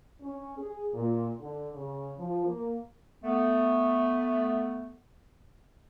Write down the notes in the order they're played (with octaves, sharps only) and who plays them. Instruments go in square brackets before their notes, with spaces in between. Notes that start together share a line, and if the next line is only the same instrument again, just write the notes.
[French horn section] C#4
G#4
A#2
D3
C#3
F3
A#3
[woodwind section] A3 B3